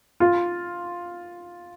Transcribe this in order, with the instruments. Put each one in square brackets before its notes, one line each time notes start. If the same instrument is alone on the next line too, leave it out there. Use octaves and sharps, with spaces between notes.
[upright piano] F4